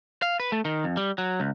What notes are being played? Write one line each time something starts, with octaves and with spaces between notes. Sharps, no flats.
F5
B4
A3
D#3
F2
G3
F#3
C#2